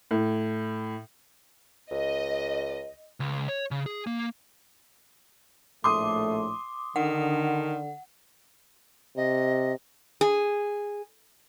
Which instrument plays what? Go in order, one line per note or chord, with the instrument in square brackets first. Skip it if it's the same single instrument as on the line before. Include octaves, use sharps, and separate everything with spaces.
[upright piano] A2
[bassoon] C#2 [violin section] D#5
[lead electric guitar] C#2
C#5
C#3
G#4
A#3
[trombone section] A#1 A2 A3 [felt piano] C6 D#6 [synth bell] D6
[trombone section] D3 [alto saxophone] D#3 [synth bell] F#5
[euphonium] C3 [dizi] D#5
[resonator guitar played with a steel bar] G#4